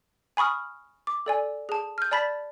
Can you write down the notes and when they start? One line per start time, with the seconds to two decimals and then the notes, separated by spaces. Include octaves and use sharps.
0.37 G#5 B5 C#6 D#6 F6
1.07 D6
1.26 A4 D5 G#5
1.69 G#4 A5
1.98 F6 G6
2.11 D5 A5 B5 A6 B6